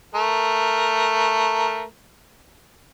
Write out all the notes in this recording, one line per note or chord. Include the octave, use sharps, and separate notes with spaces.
A3 A#4